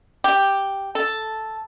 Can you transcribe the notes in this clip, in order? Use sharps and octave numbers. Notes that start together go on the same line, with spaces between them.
G4
A4